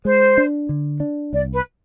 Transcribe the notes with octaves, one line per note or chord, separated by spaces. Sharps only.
G#3 C5
D4
D3
D4
C2 D5
B4